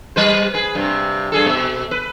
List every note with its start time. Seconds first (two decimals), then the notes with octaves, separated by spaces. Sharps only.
0.16 G3 B4 C5
0.54 G#4 B4
0.75 G2 C3
1.32 G2 G#4 A4
1.46 B2 E5
1.91 B4